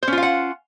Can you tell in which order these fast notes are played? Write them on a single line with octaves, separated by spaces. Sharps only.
C5 C#4 F4 F5 F#5